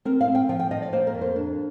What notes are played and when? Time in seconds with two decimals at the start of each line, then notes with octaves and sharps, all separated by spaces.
0.05 C4 A#4
0.21 F5
0.28 C4
0.35 G5
0.49 F3 G5
0.60 G5
0.71 F3 D#5
0.82 D5
0.93 A#3 C5
1.07 A#4
1.14 F2
1.21 C5
1.36 D4